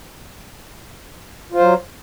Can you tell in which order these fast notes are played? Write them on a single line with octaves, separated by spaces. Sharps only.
F4 C5 F#3